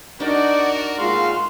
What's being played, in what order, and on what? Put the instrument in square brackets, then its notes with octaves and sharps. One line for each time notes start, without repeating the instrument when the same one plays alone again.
[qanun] D4 D#4 [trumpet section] F#4 A#4 [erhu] D5
[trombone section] A#2 G#3 F4 [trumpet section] A3 F#4 F5 [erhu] C6